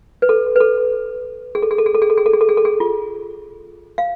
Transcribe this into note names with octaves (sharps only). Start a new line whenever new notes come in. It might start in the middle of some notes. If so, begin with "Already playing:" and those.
B4
A4
B4
A4
G#4
A4
G#4
A4
G#4
A4
G#4
A4
G#4
A4
G#4
A4
G#4
A4
G#4
F4
F5